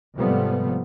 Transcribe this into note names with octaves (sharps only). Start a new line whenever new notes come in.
G#2 C3 F3 G3 A3 B3